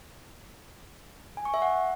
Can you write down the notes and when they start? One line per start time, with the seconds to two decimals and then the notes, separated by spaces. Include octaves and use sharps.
1.37 G#5
1.45 C#6
1.54 E5
1.62 F#5